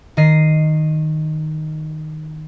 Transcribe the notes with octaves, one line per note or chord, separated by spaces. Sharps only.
D#3 D#5 C7